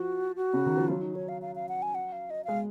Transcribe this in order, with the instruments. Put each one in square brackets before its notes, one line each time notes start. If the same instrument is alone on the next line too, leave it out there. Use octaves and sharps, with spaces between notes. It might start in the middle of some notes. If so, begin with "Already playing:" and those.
Already playing: [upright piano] F3 [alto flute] F#4
[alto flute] F#4
[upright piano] C#3
D#3
F3
[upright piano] F#3 [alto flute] F4
[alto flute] D#4
C#5
F5
F5
F5
F#5
G#5
F#5
F5
D#5
[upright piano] G#3 [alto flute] F5